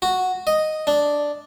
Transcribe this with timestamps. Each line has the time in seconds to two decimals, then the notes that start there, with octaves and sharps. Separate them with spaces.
0.02 F#4
0.47 D#5
0.87 D4